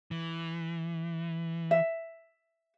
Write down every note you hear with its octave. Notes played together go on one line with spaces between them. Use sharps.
E3
E5